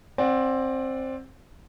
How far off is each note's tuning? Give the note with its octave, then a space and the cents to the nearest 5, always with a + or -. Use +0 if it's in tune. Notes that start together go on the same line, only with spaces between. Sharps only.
C4 +15 D5 +0 F#5 -10